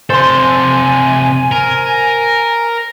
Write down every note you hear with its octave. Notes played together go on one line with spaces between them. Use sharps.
C3 A4 C5 G#5 C6
A#4